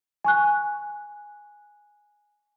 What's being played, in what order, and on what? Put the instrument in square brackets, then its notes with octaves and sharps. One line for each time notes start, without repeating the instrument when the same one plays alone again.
[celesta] G#5 C#6 F#6